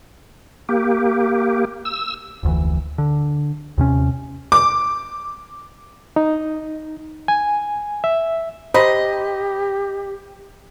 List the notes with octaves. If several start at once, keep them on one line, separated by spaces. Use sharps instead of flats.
A#3 G4
E6
F1 D2 E3
D3
D#2 C3 C#4
D6
D#4
G#5
E5
G4 C5 D#5 A#5 B5